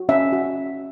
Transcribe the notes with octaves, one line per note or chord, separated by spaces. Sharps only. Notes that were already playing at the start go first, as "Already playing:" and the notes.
Already playing: F#4
C#4 E5
F#4